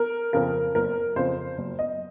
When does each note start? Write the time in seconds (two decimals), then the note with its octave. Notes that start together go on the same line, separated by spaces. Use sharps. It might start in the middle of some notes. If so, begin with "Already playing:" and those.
Already playing: A#4
0.33 F2 C#3 A#4
0.75 F#1 A#4
1.16 F2 C#3 C5
1.58 F#1
1.79 D#5